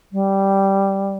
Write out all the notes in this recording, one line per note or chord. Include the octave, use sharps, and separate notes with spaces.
G3